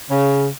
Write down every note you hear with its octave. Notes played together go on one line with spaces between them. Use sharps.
C#3